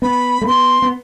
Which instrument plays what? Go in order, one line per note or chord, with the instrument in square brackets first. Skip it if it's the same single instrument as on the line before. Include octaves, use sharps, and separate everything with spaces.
[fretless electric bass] B3 [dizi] B5
[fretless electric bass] A3
[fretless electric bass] B3 [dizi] C6
[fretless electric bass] B3